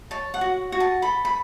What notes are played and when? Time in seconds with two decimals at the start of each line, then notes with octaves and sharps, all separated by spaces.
0.11 C#5 A5
0.34 F#5
0.41 F#4
0.72 F#4
0.80 A5
1.02 A4 B5
1.25 B5